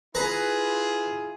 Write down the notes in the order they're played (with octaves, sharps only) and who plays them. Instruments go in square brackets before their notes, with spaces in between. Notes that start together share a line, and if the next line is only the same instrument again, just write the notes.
[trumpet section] E4 F4 G#4 [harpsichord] B4 A#5